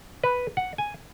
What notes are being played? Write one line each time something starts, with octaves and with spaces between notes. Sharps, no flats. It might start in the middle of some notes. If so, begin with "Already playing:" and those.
B4
F#5
G#5